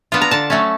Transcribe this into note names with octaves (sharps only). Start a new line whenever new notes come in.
B3 D4 F4
A#5
D3 A5
F#3 A3 C#4